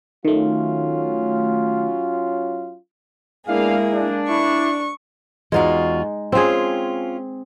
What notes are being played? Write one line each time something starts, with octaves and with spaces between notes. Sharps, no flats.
D#3 F#3 A3 C#4 F4
G#3 A#3 B3 D4 E4 G#4 F5
D4
E4 C#6
E2 G#3 D#4 F4 F#4
C4 C#4 F4 G#4